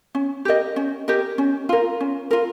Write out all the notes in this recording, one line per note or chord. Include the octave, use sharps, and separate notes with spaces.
C#4
G4 A#4 D#5
C#4
G4 A#4 D#5
C#4
F4 A#4
C#4
F4 A#4